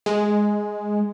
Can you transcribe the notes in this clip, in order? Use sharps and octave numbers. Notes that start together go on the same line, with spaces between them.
G#3